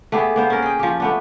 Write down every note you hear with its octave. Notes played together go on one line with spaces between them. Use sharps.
A3 B3 G4 G#4
A#3 B3 C5
C#4 A#4
G#4 G5
F3 G4
A3 B3 D4